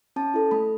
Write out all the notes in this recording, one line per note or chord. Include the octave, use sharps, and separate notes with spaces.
C#4 A5
E4 A4
A3 B5